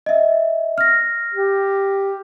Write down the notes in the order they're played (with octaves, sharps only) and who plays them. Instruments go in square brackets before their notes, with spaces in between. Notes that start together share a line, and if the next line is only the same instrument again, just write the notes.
[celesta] D#5 E5
F6 A#6
[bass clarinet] G4